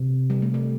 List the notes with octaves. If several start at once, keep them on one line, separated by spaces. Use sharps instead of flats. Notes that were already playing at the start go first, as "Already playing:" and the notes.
Already playing: C3
G3
A3
G3